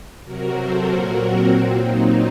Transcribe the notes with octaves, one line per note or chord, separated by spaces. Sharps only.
C3 F#3 F#4 A#4
A4 C5
A#2 F#3 F#4 A#4
C4
A#2 F#3
C4 D#4